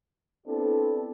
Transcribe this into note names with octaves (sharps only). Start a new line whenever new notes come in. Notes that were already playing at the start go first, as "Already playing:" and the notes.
B3 C4 D4 E4 G4 A4